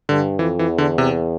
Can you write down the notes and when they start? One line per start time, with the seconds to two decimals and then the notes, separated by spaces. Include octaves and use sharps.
0.09 G2 D3
0.39 F2 E3
0.59 E3
0.69 E2
0.78 D3
0.98 C3